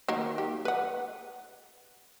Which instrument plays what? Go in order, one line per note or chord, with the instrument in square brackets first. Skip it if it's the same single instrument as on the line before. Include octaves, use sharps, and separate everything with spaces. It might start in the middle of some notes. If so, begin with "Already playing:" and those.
[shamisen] D#3 F#3 A#3
G4
B4 F#5